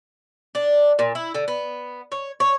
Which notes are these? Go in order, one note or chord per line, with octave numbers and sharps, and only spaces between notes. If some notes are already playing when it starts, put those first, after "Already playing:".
D4
A#2
E4
D3
B3
C#5
C#5